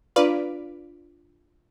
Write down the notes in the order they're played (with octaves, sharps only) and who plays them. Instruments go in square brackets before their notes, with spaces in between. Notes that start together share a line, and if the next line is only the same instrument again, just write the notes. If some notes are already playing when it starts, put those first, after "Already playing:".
[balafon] D4 F4 [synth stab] B4 D5 F5